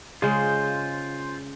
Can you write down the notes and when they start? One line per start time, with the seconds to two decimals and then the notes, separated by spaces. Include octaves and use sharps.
0.22 C#3 G#3 F4 C5